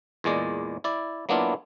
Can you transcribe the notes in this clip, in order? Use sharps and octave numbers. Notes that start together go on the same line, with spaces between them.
E2 A#2 G#3 D5
E4 D5
F#3 A#3 B3 D4 E4 F4